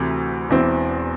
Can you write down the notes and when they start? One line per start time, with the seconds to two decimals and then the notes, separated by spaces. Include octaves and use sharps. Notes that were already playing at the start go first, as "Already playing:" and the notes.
Already playing: D2 C3 E3
0.49 E1 E2 E3 C4